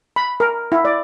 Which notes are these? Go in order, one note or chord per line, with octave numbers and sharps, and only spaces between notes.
B5
A#4
E4
D5